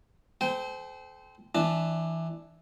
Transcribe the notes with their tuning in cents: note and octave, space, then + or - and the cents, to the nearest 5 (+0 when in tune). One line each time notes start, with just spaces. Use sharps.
A4 -40 C5 -25 G5 +0
E3 -10 D4 +10 A5 -15